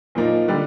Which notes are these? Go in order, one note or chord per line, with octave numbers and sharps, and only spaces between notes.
A#2 F3 A#3 D#4
D3 G3 D4